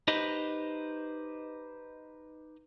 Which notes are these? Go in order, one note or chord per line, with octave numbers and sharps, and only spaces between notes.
D#4 G4 B4 C5 D#5